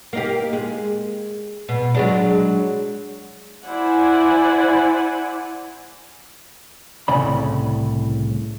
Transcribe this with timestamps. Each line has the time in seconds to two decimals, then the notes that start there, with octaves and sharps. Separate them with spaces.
0.13 A#3 D#4 G4
0.53 G#3
1.69 B2
1.95 F#3 G#3 D4
3.66 E4 C5 D5 F#5 G#5
7.08 C2 A2 C#3 D5 B5